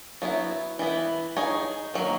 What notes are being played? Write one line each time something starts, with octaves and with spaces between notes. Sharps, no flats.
F#3 B3 E4
E3 B3 E4
D#4 G#4 C#5
D#3 F#3 A#3